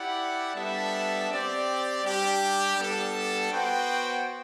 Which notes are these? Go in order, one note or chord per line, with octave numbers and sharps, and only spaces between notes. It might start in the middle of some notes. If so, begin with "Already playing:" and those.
Already playing: E4 G4 D5 F#5
G3 B3 D4 A4 E5
C4 G4 D5
G3 D4 G4
G3 B3 D4 A4
B3 F#4 C5 G5